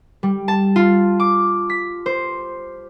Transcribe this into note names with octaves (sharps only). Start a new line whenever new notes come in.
G3
A5
F4
D6
B6
C5